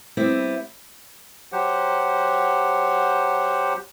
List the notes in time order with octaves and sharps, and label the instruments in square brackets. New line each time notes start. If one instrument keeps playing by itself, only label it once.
[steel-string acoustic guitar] G3 B3 C4 E4
[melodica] F#3 G4 C5 F#5